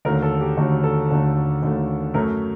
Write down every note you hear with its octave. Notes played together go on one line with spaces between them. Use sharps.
D#2 D3 F#3 A3 A#4
A4
G4
D#2 D3 F#3 A3 F#4
A4
D#2 D3 F#3 A3
D#2 D3 F#3 A3
F#2 F#3 A3 A#4